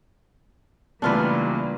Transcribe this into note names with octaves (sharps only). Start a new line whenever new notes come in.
C#2 E3 G3 A3 A#3 D4 F4 B4